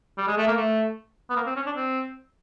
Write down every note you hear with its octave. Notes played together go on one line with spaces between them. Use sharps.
G3
G#3
A3
A#3
A3
B3
A#3
C4
C#4
D4
C4